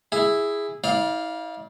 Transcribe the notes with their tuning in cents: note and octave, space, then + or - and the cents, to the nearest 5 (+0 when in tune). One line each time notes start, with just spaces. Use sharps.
E4 +0 G#4 -10 E5 +0
E4 -45 D5 +0 F5 +0